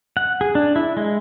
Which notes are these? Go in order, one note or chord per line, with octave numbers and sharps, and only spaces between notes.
F#5
G#4
D4
E4
G#3